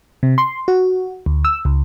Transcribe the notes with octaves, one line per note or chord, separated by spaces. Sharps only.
C3
C6
F#4
D2
E6
C#2